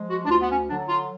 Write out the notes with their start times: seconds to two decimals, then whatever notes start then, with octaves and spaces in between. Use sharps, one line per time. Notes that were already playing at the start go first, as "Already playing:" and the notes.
Already playing: F3 G#3
0.09 F#4
0.25 D4
0.29 D2 F4
0.41 B3
0.50 C#4
0.69 D3 F#3 D4
0.89 F4